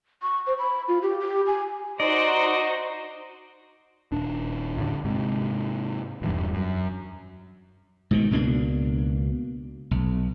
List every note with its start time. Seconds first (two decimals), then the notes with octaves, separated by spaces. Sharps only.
0.23 C#6
0.47 C5
0.59 B5
0.88 F4
1.02 G4
1.20 G4
1.47 G#5
2.00 D#4 F#4 C5 D5 D#5
4.12 D#1 D4
4.77 A1 D3
5.05 G#2 C3
6.22 D#1 E2 G2
6.53 F#2
8.11 G#2 B2 D#3
8.31 C#2 B2 A#3 D4
9.91 B1